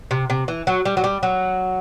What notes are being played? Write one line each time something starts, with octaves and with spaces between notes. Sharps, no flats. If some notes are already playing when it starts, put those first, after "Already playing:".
C3
C3
E3
F#3
G3
F#3
G3
F#3